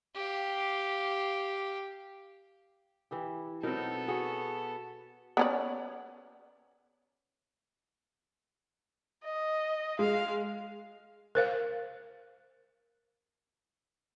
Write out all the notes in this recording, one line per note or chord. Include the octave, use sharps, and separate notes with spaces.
G4 F5
E3 E4 G4
B2 F#3 B3 C4 D#4 A4 A#4
F#4 G#4 C#5
B3 C#4 D5
D#5
G#3 F5
A#4 C5 F5